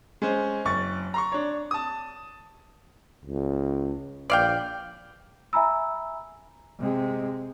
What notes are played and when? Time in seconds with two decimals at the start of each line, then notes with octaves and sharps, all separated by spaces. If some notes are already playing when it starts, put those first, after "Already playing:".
0.22 G#3 C#4 C5
0.65 F#1 C#6 A6
1.14 A#5 C6 C#6
1.32 D4 C#5
1.71 A5 D#6
3.25 C#2
4.30 A#1 D5 F5 G5
5.53 E5 G#5 A#5 B5 E6
6.80 C3 G#3